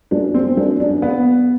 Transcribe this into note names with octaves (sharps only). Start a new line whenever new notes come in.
F#2 D4
C4
F#2 D4
D4
B3